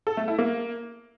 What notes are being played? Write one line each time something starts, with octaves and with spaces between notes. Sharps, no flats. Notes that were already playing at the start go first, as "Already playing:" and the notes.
A4
A3
E4
A#3